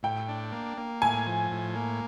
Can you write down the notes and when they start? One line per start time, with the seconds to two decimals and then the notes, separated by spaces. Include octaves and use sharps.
0.03 A2 G5
0.29 D4
0.52 A#3
0.78 A#3
1.02 A2 G#5
1.26 F3
1.51 A2
1.75 A#3